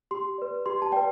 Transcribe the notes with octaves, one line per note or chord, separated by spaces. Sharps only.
G4 C6
B4 D5
G4 C6
A5
B4 D5 G5